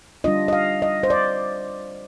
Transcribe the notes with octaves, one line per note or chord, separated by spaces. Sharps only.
G3 D4 F4 D#5
D#5
F5
D#5
C5
D5